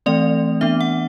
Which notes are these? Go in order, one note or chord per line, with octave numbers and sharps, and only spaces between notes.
E3 A3 C4 D5
E3 B3 D4 E5
F#5